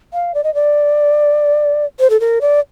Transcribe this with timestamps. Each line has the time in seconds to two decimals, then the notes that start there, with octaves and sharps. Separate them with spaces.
0.14 F5
0.34 D5
0.44 D#5
0.55 D5
2.00 C5
2.10 A4
2.20 A#4
2.41 D5